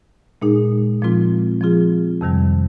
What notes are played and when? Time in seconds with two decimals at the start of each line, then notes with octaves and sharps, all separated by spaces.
0.42 A#2 G#3 D#4 G#4
1.02 A#2 F3 G#3 C4 F4
1.61 F3 C4 F4 G#4
2.21 F2 C3 D#3 G3